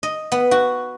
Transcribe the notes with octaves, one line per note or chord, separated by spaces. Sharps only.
D#5
B3
F#4